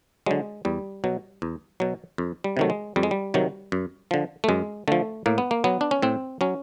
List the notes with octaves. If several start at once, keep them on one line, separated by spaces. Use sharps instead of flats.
D3 F#3 G#3
E2 G3
B2 F#3
E2
B2 F#3
F2
G3
C3 D#3 F#3 A3
G#3
F2 G3
G#3
G3
C3 D#3 F#3
F#2
D3 F3
A3
F#2 G#3
D3 F3 A3
A2 A#3
B3
A#3
F#3 B3
D4
C#4
A2 C4
F#3 C#4